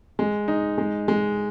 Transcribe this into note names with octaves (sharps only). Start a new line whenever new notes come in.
G#3
D#4
G#3
G#3